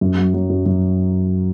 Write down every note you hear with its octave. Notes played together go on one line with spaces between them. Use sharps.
F#2
F#3
F#3
F#2
F#2